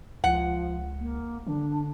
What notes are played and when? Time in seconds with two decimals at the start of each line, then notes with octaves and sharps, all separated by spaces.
0.24 C#2 F3 F#5
1.00 A#3
1.47 D3 D4